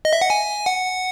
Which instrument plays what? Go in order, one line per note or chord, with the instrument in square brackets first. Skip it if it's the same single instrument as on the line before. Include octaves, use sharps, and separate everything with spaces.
[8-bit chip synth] D#5
E5
F#5
G#5
F#5